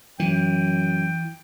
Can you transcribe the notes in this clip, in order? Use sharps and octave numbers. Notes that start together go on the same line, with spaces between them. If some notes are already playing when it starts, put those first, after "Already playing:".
F#2 E3 G5